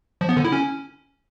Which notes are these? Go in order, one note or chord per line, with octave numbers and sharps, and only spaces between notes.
F3
B3
D3
E4
C#4